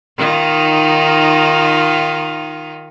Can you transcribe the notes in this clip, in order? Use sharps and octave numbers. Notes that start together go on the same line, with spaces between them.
D#3 D#4 F4